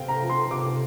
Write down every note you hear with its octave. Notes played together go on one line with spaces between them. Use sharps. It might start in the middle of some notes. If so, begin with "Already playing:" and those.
Already playing: C3 C4 F5 G5
A#5
F3
C6
C3 D6